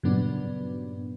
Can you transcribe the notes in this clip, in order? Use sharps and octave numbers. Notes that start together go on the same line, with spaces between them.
G2 A#2 C#3 F#3 B3 D4